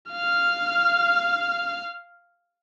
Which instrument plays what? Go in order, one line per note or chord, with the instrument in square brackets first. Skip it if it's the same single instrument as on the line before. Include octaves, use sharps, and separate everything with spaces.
[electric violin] F5 F6